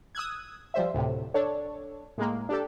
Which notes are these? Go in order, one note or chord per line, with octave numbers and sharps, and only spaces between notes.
D#6 E6 F#6 G#6
F3 G3 C5 E5
D2 A2 C3
D4 A4 C#5
A2 G#3 A#3
D4 G4 A4